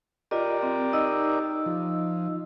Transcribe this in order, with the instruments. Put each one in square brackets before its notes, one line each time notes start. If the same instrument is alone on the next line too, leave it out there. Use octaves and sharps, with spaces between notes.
[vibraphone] F4 D#5 [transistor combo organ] G4 A#4 D5
[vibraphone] C4
D#4 D#5 E6
[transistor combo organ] F3